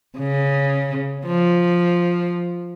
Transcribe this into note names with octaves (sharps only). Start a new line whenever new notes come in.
C#3
F3